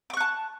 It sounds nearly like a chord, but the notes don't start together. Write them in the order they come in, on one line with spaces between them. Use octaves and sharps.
D6 C#6 F#6 A5